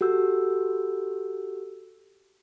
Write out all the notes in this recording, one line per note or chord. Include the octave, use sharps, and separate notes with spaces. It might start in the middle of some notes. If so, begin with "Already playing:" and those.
F#4 G4 A4 E6 G6